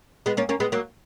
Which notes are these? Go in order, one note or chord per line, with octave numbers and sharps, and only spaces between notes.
G#3 B3
A#3 C#4
A#3 C#4
G#3 B3
F#3 A#3